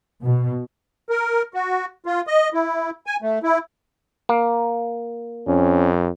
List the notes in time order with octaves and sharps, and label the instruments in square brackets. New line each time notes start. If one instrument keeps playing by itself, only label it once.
[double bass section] B2
[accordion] A#4
F#4
F4
D#5
E4
G#5
A3
E4
[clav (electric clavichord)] A#3
[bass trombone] F2 [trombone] C#4